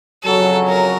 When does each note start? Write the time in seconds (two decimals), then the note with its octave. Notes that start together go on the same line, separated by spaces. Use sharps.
0.23 F2 C#3 F#3 A4
0.68 A#4